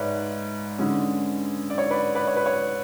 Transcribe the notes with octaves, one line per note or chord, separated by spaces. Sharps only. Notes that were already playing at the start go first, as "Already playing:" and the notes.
Already playing: G#2 B4 C#5 D5 E5
D3 G#3 C#4
D5
C#5
B4 D5
B4 D5
C#5
B4
C#5